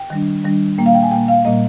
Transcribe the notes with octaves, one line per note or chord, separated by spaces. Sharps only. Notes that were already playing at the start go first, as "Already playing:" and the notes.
Already playing: G5
D#3 G3 D4
D#3 G3 D4
A#2 G3 A#3 G5
F5
G5
G#5
A#2 G3 A#3 G5
F5
A#2 G3 A#3 D#5